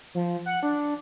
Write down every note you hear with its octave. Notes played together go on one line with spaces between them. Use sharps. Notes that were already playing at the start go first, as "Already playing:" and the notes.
F3
F#5
D4